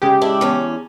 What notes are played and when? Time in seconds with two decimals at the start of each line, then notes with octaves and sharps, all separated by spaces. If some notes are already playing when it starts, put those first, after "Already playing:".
0.02 C#3 G#3 G4
0.21 D4 E4
0.41 E2 C#4